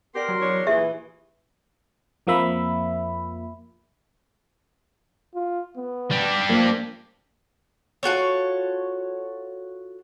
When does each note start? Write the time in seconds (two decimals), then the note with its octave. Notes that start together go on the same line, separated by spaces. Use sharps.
0.14 B3 G4 A#4 D5 C6
0.28 F#3
0.41 E2 D4 C#5
0.67 A#2 E3 G4 G#4 E5
2.27 F2 F3 A#3 E5 B5
5.35 F4
5.77 B3
6.11 G3 D4
6.49 F3 A#3
8.03 F4 F#4 A4 C#5